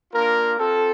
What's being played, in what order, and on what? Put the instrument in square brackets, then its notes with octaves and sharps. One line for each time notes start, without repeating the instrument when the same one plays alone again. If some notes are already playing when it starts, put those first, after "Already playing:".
[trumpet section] A#3 D4 F4 A#4
C4 F4 A4